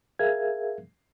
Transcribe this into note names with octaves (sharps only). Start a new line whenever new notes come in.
G#4 A#4 E5 F5 G#6